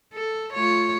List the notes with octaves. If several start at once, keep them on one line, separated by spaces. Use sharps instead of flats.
A4
A3 F4 C#5